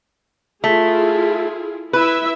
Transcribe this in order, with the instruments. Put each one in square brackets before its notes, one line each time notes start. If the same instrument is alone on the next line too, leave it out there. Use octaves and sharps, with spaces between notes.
[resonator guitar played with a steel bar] A3 [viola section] E4 F4 G#4
[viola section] E4 E5 [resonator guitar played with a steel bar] B4